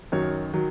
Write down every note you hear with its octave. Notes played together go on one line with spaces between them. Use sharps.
F#2 D#3 F#3 C#5
D#3 F#3